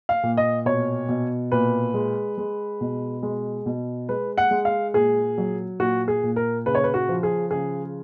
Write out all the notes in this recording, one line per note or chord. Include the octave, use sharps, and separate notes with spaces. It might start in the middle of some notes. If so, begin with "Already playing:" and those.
F5
A#2
D#5
B2 C#5
B2
A#2 B4
G#3
G#3
B2
G#3
B2
G#3 B4
F#5
G#3
F5
A#2 G#4
F#3
A#2 F#4
G#4
A#2
A#4
C#3 B4
C#5
B4
F#4
F3
G#4
C#3 G#4